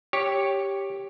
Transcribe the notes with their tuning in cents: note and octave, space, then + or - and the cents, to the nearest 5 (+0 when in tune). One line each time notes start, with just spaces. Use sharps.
G4 +5 C#5 +0